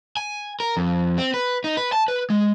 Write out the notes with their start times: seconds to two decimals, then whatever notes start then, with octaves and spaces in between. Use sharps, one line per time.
0.17 G#5
0.60 A#4
0.77 F2
1.18 C4
1.34 B4
1.64 D#4
1.77 B4
1.92 A5
2.08 B4
2.30 G#3